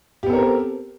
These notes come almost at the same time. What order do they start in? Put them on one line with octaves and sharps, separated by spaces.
G4 B3 A4 A#4 C4